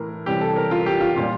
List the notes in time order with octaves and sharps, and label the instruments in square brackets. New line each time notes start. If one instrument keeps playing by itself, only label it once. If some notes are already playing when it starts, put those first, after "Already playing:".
Already playing: [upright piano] A2 E3 A#4
C3 E3 G3 G4
A4
A#4
F4
G4
F4
A#2 G3